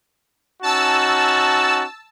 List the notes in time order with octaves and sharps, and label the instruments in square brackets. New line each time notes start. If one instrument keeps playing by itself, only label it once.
[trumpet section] C#4 D#4 F#4 [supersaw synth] A5 E6